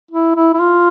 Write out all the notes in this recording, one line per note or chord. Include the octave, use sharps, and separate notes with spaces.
E4
E4
E4
F4